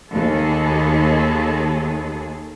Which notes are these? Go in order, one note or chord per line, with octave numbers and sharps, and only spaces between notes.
D#2 G#4 A4